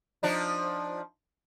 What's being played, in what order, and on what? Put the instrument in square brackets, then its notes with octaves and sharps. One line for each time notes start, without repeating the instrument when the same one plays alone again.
[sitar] F3 D4 D#4